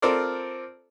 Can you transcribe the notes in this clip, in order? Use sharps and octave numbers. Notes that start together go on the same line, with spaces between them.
C4 F4 A4 A#4 C5 D5